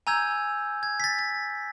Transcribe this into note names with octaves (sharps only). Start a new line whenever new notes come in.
G#5 A#5 E6 G6 G#6
G#6
A6 B6
A6